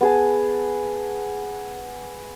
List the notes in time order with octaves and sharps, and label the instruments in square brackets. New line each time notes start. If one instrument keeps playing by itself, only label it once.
[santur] B3 G#4 A5